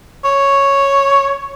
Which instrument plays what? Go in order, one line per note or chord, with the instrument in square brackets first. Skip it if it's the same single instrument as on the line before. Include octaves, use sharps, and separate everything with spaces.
[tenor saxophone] C#5